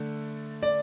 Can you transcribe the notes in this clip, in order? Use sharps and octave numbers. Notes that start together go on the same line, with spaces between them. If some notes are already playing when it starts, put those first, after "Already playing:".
Already playing: D3 A3
D5